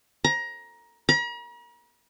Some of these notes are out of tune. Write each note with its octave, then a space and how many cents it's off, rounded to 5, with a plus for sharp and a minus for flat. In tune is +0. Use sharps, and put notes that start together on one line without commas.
A#5 +20
A#5 +45